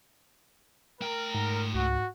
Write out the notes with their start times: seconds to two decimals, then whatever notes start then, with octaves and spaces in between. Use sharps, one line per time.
1.01 A3 A#4 G5
1.35 G#2
1.74 C#2 F#4